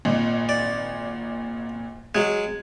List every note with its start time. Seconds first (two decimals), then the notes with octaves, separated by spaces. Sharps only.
0.05 G#1 A#2 D#5
0.49 D5
2.15 F#3 G#3 G#6